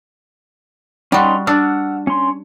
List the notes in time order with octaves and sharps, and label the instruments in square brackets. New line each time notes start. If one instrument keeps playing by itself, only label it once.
[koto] G3 F#4 [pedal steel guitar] C#4 D#4 C6
[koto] D4 [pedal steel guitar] F#5 E6 F6
[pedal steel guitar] C#4 C6